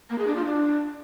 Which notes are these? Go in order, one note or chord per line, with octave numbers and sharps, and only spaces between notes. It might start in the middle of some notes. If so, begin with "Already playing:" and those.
A#3
G#4
D4
F4
D4